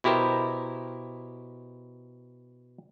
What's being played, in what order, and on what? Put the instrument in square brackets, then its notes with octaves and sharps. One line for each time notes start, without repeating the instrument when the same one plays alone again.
[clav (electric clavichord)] B2 E4 G4 A#4 C5